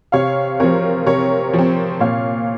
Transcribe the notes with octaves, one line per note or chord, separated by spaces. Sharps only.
C3 C#5 F5
F3 C4 A#4 C#5
C3 A#4 C#5
F3
C4
A#2 C#5 F5